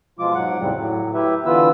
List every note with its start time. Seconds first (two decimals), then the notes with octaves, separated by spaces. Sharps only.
0.19 B2 F3 G#3 F4 D6
0.35 G#2 F#3 F#5
0.60 F2 A2 C#3 G3 C4
0.75 A2 F#3
1.14 E4 G4 B4 E5
1.46 D3 E3 B3 F4 B4 E6